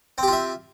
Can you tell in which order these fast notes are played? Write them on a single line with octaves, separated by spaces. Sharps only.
C4 G4 F4 E5